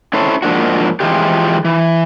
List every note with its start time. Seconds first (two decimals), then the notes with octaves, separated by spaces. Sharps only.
0.13 C#4 E4 A4 C5 C#5
0.43 G#2 F3 A#3 D4 F#4
1.00 E3 F3 G#3 F4 G4
1.65 E3